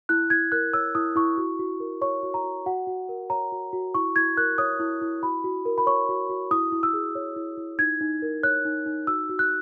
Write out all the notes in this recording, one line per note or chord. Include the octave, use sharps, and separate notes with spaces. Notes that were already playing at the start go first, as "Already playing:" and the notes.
E4 F#6
E4 G#6
A#4 F#6
C#5 E6
E4 D#6
E4 C#6
F#4
F#4
A#4
C#5 C#6
F#4
A#5
F#4
F#4 F#5
F#4
A#4
C#5 A#5
F#4
F#4
E4 C#6
E4 G#6
A#4 F#6
C#5 D#6
E4
E4
F#4 B5
F#4
A#4
B5
C#5 C#6
F#4
F#4
E4 D#6
E4
E6
G#4
C#5
E4
E4
D#4 G#6
D#4
A#4
C#5 F#6
D#4
D#4
F#4 E6
F#4
F#6